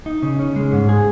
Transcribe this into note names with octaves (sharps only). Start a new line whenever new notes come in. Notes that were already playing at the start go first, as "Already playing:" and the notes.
D#4
C#3
C#4
G#3
G#2
G#4